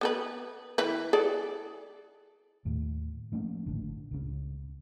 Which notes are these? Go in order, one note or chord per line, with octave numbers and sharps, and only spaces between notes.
B3 A4 B4
E3 E4 B4
G#4 A4 D5
D#2 A2
F3 A3 A#3 C#4
G#1 A2 D3
C#2 C#3